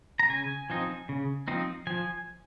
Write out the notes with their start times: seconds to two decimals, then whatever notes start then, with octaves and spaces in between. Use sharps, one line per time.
0.20 A#5
0.29 C#3 G#5
0.70 F3 C4 D#4
1.09 C#3
1.48 F3 C4 D#4
1.87 F3 G#5